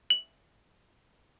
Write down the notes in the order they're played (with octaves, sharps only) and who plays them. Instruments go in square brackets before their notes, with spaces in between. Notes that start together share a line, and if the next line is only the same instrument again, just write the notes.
[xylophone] F#7